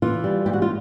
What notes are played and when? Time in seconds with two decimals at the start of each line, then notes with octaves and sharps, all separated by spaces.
0.02 E3 F4
0.24 G3
0.46 G#2 G4
0.53 F#4
0.62 F4